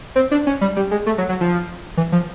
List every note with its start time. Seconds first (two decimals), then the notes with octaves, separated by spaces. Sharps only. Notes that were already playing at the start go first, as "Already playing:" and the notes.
0.16 C4
0.31 D4
0.47 C#4
0.61 G3
0.76 G3
0.91 G#3
1.06 A3
1.18 F#3
1.29 F#3
1.41 F3
1.97 E3
2.12 F3